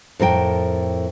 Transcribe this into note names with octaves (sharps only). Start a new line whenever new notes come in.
F2 A2 A#4 G5